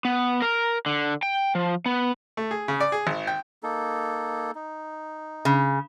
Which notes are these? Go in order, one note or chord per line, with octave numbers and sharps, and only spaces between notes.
B3
A#4
D3
G5
F3
B3
A3
G#4
C#3
D5
G#4
G#1
G5
A#3 D#4 A4
D#4
C#3